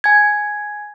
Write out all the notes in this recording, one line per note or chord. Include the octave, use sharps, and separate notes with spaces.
G#5 G#6